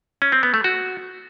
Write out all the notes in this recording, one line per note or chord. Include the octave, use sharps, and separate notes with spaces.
C#4
C4
B3
A3
F#4